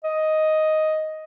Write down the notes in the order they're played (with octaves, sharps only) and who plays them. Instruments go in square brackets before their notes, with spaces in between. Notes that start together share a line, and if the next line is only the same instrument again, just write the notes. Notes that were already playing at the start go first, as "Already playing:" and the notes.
[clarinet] D#5